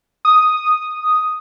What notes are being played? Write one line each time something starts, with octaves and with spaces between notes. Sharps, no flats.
D#6